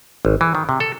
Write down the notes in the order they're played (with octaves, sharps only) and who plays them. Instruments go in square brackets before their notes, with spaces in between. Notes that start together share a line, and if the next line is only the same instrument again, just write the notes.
[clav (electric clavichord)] G#1
E3
D#3
C3
A4